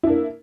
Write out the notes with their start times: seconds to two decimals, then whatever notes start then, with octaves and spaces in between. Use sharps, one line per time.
0.03 E4
0.07 D4
0.10 A#3